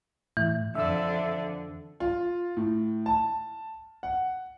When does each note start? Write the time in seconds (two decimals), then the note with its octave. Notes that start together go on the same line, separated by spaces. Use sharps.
0.37 A2 E3
0.75 F2 D3 E5 E6
2.00 F4
2.57 A2
3.06 A5
4.03 F#5